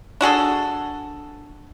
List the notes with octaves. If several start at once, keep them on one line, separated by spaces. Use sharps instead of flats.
D4 F#4 G#4 A4